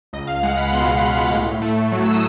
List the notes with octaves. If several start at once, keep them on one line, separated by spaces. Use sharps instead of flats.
C#2 D#5
F5
G#3 F#5
B5
B2 C6
C#2
A2
A3
F#3
E6
D#6